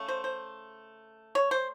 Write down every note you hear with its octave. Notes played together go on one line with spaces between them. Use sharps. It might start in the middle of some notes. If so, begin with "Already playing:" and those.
Already playing: C#3 A3
C5
C5
C#5
C5